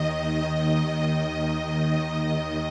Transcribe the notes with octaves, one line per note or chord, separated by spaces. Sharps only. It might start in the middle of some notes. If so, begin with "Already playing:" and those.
Already playing: D#2 D#3 D#5